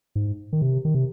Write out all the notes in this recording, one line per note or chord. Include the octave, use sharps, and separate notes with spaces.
G#2
D#3
C3
D#3
C3